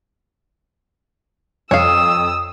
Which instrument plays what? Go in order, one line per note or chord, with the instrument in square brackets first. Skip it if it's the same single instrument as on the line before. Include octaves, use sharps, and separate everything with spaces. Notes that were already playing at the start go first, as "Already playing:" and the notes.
[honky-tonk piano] F2 [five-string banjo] C#5 F5 [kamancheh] D#6 E6